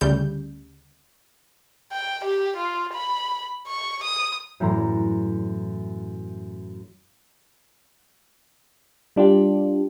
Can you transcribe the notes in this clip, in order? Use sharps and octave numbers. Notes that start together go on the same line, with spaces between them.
D2 C#3 G3 G6
G5
G4
F4
B5
C#6
D#6
F#2 A2 E3 A#5 C6
G3 D4 F4 G4